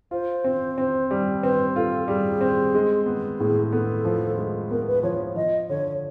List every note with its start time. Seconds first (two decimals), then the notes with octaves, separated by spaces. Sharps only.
0.11 F4 C5
0.44 C4
0.78 C4
1.11 G3
1.42 C4 B4
1.76 F4 A4
2.08 G3 G#4
2.41 C4
2.75 G#3
3.06 B3
3.39 A2 G#4
3.72 B3 A4
4.05 F3
4.38 G#3
4.71 B3 A#4
4.88 B4
5.03 F3 C#5
5.36 F3 D#5
5.69 D3 C#5